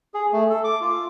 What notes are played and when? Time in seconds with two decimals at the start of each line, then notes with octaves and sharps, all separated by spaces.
0.14 G#4
0.33 A3
0.50 A4
0.64 D6
0.81 F4